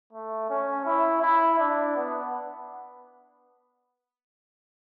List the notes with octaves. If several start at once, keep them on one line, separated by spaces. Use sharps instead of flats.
A3
C#4
E4
E4
D4
B3